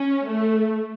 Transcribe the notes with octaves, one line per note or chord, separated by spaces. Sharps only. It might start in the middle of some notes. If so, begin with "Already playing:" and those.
Already playing: C#4
A3